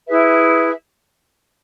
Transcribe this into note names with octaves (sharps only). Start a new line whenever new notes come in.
E4 G#4 B4 E5